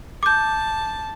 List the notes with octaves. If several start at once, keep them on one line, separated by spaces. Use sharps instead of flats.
A5 D6 G6